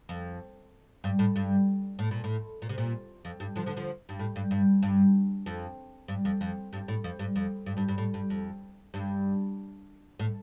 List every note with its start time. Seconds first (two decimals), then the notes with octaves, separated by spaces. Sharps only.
0.09 F2
1.04 G2
1.19 A2
1.36 G2
1.99 A2
2.11 A#2
2.24 A2
2.62 A#2
2.69 C3
2.78 A#2
3.25 F2
3.40 G2
3.56 D3 F3
3.66 D3 F3
3.76 D3 F3
4.09 G2
4.19 A2
4.36 G2
4.51 G2
4.83 G2
5.46 F2
6.08 G2
6.25 F2
6.41 F2
6.73 G2
6.88 A2
7.04 F2
7.19 G2
7.36 F2
7.66 G2
7.77 G2
7.88 G2
7.98 A2
8.14 G2
8.30 F2
8.94 G2
10.19 A2